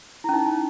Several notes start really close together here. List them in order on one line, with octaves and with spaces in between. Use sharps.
E4 C#4 D#4